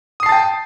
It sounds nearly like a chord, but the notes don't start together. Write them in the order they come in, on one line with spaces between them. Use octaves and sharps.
D#6 C7 A5 A6 G5